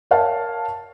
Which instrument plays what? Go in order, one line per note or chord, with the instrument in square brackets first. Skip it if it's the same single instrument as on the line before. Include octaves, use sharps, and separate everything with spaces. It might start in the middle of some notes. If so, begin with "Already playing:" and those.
[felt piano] A#4 C#5 E5 F5 G5 A5